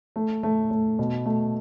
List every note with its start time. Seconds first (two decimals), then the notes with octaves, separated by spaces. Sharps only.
0.16 A3
0.43 A3
0.71 A3
0.99 B2
1.26 A3